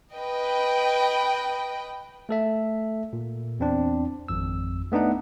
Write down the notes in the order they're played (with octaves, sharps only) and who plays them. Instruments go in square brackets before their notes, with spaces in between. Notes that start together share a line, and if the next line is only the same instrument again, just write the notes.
[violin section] B4 D#5 G5
[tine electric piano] A3 A4 E5
A#2
E2 C4 D4
G#1 F2 E6
A3 B3 D4 D#4 F#5